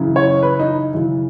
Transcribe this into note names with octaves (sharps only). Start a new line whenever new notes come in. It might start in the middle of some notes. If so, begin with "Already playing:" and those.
Already playing: F#2 C#3 E3
C#5
B4
D#4
F#2 C#3 E3